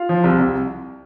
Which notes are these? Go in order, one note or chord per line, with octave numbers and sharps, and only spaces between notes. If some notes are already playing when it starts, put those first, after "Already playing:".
Already playing: F4 F5
F3
C2
C2